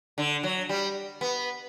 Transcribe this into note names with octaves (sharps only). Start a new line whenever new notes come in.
D3
F#3
G3
B3